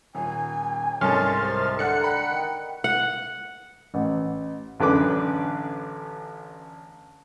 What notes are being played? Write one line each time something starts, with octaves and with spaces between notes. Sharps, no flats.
D#1 G#5
C2 G#2 C#4 A4 A#4 C6 F6 A6
C3
D3 F#5 F#6 C#7
G5 A#5 B5
D#3
F#5
A1
A1 F#2 D3 B4 D6